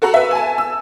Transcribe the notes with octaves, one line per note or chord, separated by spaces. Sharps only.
F#4 A4 F#5 A#5
B4 E5
G#5 A5
E6